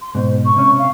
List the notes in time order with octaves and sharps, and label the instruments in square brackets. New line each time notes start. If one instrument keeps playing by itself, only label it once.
[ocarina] C6
[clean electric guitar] G#2 B2 [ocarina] C5
[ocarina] C#6
[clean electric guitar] C3 C#4
[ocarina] F5